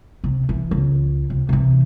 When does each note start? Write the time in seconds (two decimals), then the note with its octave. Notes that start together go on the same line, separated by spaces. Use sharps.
0.24 C3
0.49 E3
0.71 C#2
1.30 C3
1.49 C3 E3